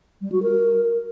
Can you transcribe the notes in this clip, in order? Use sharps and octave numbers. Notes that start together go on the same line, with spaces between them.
G3
F#4
A#4